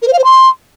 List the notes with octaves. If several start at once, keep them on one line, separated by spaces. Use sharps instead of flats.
A#4
C5
F5
C5
C6